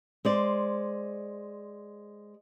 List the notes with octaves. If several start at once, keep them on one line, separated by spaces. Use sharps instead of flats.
G#3 C5 D5